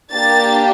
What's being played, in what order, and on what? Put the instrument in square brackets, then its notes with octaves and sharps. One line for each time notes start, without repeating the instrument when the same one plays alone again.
[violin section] A#3 D4 G4 A6